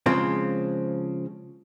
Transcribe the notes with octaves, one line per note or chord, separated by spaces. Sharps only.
C#3 F3 G#3 C4